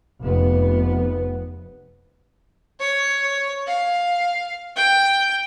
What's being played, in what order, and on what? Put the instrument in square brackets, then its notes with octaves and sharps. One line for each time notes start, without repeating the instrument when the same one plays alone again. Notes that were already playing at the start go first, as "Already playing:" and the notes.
[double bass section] F1 B3
[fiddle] C#5
F5
G5